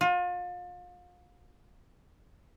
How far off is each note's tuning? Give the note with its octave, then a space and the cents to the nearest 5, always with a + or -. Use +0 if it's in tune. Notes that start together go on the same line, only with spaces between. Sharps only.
F4 +35